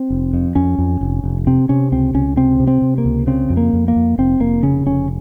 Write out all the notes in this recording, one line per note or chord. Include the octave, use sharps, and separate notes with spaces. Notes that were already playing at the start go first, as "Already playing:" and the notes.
Already playing: C4
F1
F2
F2 C#4
F2
F1
F1
C3 C4
C3 C#4
C#2 C4
C#2 C#4
C3 C4
C3
C4
C3
A#3
C#2
C#3 C4
F2
A#3
F2
A#3
F2
F1 C4
F1 A#3
C#3 C#4
F1 C#4